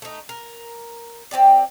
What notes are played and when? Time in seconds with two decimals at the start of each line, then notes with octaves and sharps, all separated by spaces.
0.02 A3 D#4
0.29 A#4
1.31 C4 C#4 G4 D5